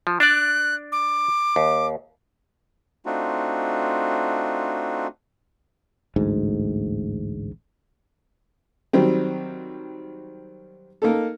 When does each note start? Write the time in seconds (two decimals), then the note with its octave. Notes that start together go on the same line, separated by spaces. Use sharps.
0.07 F3
0.20 D4 D5 F#6
0.92 D6
1.56 D#2
3.06 A3 C4 D4 D#4 F4 F#4
6.16 A1 D2 G#2
8.93 D#3 F#3 G3 C4
11.02 A#3 D#4 A4